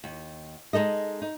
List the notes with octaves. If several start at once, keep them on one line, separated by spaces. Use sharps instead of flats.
D#2
G#3 D#4 A4 D#5
D#4